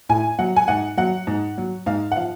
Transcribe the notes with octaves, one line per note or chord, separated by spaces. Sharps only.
A2 G#5
F#3 F#5
G#5
G#2 F#5
F#3 F#5
G#2
F#3
G#2 F5
F#5
F3 F5